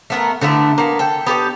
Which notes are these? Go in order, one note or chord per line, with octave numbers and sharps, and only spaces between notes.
A3 B3 A#4
D3 A3 B3 E4
A#3 B3
A4 G5
B3 G4 A4 D5